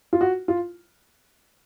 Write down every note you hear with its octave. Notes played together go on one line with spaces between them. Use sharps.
F4
F#4
F4